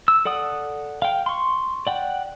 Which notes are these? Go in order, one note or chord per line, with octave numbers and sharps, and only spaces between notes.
E6
A4 D5 F#5 D#6
F5 G5
C6 C#6
D5 F#5 G5